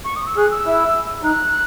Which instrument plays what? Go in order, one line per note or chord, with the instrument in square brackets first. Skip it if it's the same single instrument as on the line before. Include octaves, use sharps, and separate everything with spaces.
[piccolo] C#6
D#6
E6
[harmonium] G#4 [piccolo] F#6
[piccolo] E6
[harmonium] E4
[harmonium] D#4 [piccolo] F#6